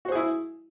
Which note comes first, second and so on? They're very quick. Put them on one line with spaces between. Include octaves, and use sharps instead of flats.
F#4 C5 G#4 E4